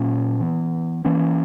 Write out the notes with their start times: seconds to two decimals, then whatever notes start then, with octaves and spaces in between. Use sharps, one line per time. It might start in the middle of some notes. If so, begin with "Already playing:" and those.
Already playing: A#2 F#3 A#3 C#4
0.40 E3 B3
1.05 E3 A#3 C#4